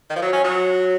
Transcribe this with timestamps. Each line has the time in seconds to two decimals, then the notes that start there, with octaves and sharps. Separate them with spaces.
0.10 D#3
0.16 F3
0.22 F#3
0.33 C#4
0.45 F#3